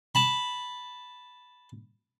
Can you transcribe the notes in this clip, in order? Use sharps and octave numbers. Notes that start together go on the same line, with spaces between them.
A5 B5